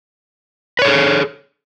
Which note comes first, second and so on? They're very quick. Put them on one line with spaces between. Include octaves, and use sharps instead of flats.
B4 C#5 A4 G#4